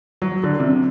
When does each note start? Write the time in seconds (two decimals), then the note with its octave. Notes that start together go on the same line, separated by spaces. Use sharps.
0.22 F#3
0.43 D3
0.60 C3